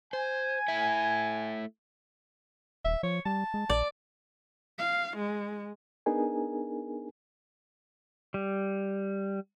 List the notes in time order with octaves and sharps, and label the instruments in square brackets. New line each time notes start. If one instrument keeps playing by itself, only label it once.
[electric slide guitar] C5 [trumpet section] G#5
[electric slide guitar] A3 E4 E5
[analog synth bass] D#1 [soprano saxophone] E5
[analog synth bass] F3 [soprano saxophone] C#5
[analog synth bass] G3 [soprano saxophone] A5
[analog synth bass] G#3
[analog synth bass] A#1 [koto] D5
[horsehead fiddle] F5
G#3
[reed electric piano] B3 D4 D#4 G#4 A#4 G#5
[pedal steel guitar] G3